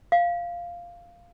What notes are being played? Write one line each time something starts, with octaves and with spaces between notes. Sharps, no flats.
F5